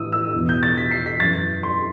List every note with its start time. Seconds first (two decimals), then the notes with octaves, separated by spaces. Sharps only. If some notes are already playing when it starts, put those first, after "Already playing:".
Already playing: A2 E3 D#6 E6
0.12 E6
0.34 E2 B2
0.49 G6
0.63 A6
0.77 B6
0.91 C7
1.06 B6
1.20 F#2 E3 A6
1.63 C6